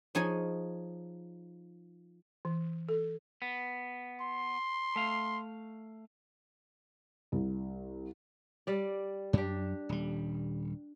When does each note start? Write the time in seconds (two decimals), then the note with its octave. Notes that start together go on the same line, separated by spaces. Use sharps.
0.15 F3 D#4 G#4 C#5 D#5 G#5
2.45 E3
2.89 A4
3.42 B3
4.21 C6
4.96 A3 F5
7.32 C2
8.67 G3 D5
9.33 F#2 D4 G4
9.89 D#1 G3